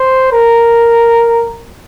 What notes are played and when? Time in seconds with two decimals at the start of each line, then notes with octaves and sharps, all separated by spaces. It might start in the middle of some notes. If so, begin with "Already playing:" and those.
Already playing: C5
0.32 A#4